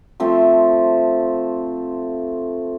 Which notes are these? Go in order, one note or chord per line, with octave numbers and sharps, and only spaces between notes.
F3 A3 C4 C6